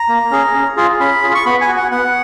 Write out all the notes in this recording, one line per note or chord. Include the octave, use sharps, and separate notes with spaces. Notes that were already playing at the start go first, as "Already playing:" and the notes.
Already playing: A#5
A#3
C#4 G#4
C#4
F4 G#4
C#4 B5
F4 G#4
C#6
B3 B5
G#5
F#4
F#5
B3 F#5